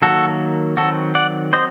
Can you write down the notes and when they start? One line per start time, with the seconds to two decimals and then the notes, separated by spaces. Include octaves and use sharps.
0.02 D#3 F#3 A#3 F#4 A4
0.77 D#3 F#3 C4 F#4 A4
1.15 D5 F#5
1.53 F#3 C4 C5 D#5